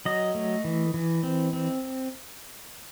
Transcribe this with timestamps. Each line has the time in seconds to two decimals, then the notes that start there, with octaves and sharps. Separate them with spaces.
0.05 F#3 D#5
0.35 A3
0.64 E3
0.94 E3
1.23 C4
1.53 C4